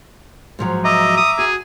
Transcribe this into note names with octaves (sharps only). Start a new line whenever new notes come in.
G#2 F3 F#3
D#5 E5 A#5 D6
D#6
F#4 G#4